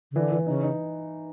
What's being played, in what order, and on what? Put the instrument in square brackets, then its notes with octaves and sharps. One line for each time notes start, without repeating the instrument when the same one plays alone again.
[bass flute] C#3
[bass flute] D3 [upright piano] E3
[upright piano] E3
[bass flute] C#3 [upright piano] D#4
[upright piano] D#4